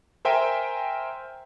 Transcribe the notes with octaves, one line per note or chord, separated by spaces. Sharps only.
A#4 C5 E5 G5 G#5 A#5